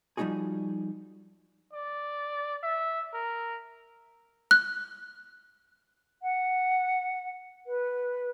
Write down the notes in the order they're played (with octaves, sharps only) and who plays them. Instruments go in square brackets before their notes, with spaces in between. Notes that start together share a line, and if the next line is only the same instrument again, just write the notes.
[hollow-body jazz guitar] F3 G3 B3 D#4 F#4 G#4
[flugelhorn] D5
E5
A#4
[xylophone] F#6
[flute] F#5
B4